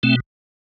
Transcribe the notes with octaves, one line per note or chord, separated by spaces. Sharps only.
B2 A3 C4